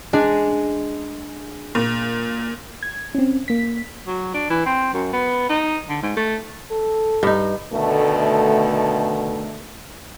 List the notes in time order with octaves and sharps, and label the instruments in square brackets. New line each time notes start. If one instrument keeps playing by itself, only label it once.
[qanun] G#3 [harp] D4
[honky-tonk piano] A#2
[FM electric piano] G#6
C4 C#4
A#3 B6
[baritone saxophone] F#3
D4
E3
C4
F#2
B3
D#4
D3
G#2
A3
[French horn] A4
[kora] G2 D#4
[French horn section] B2 D3 D#3 A3